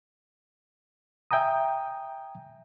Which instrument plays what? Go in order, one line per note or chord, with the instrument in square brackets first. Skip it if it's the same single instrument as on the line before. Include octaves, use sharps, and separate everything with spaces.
[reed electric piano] E5 G5 G#5 A#5 D#6